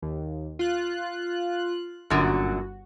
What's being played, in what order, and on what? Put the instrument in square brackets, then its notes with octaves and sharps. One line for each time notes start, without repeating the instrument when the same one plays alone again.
[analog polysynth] D#2
F4 F#6
[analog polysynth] G1 F#4 [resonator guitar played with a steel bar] F#2 A#2 D3